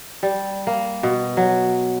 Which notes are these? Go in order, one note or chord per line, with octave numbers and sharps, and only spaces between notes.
G3
A#3
B2
F#3